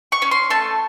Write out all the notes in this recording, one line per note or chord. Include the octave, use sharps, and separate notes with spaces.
C#6
C#4
C6
A3 A5